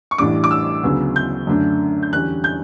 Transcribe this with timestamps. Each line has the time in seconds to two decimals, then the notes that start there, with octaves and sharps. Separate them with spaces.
0.11 C#6
0.18 A1 A2 G3 D4 D6
0.44 D6
0.51 E6
0.83 D2 C#3 F#3 B3
1.16 G6
1.47 F#2 D3 A3 D4
2.03 G6
2.12 E2 D3 G3 C#4 F#6
2.44 G6